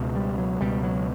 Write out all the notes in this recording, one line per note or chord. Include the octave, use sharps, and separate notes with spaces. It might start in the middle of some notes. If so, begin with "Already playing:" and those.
Already playing: C#2 B2
G3
F#3
C#2 B2 G3
F#3